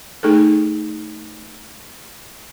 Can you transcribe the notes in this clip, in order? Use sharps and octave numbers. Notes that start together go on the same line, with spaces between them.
A3 D#4 G#4 A4